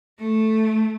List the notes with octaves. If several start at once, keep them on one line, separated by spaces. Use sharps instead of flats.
A3